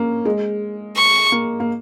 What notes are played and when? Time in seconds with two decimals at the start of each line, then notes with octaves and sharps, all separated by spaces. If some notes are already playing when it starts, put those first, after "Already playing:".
Already playing: A#3 C#4
0.25 G#3
0.97 C#6
1.32 A#3
1.60 A#3